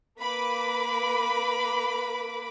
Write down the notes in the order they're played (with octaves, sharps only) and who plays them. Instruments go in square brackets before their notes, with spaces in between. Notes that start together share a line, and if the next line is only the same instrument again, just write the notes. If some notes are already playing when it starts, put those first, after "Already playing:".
[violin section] A#3 B4 B5 D6